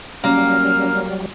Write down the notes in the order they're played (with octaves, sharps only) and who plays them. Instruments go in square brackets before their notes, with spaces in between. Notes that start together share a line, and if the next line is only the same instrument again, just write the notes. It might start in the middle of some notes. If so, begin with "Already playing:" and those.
[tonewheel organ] F#3 G3 [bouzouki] A#3 [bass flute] C#4 [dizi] F6